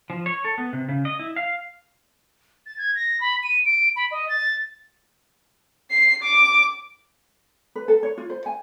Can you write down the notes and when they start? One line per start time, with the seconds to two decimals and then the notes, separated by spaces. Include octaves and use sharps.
0.10 F3
0.26 C#5
0.45 A4
0.58 B3
0.73 C3
0.89 C#3
1.05 D#5
1.19 E4
1.36 F5
2.66 A6
2.78 G#6
2.96 A#6
3.21 B5
3.43 D#7
3.65 D7
3.96 B5
4.11 D#5
4.29 A6
5.91 C7
6.23 D6
7.76 B4
7.88 A4
8.03 C#5
8.18 F4
8.30 C5
8.46 G#5